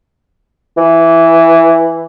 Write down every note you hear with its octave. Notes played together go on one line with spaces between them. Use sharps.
E3